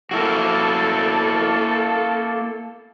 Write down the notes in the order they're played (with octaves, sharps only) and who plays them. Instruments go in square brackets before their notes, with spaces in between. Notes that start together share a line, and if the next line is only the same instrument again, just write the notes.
[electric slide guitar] A#3 E4 F#4 [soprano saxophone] A4